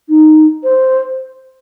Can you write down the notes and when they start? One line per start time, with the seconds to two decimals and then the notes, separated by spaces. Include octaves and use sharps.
0.09 D#4
0.64 C5